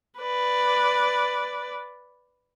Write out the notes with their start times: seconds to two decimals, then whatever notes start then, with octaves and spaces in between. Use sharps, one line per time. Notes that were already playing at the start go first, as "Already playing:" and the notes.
0.19 B4 D5